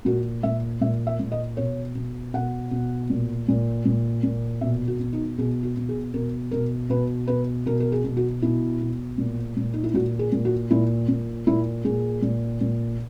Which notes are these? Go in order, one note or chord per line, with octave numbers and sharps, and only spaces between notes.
A#2 F#4
A#2 E5
A#2 E5
E5
A#2
D#5
B2 C#5
B2
B2 F#5
B2
A#2
A#2
A#2
A#2
B2 E5
F#4
B2
D#4
B2 G#4
F#4
B2
G#4
B2 A#4
B2 A#4
B2 B4
B2 B4
B2 A#4
A#4
G#4
B2
F#4
B2 E4
B2
A#2
A#2
D#4
E4
A#2 F#4
G#4
A#2
F#4
A#2 E4
A#2
A#2 E4
A#2 G#4
A#2
A#2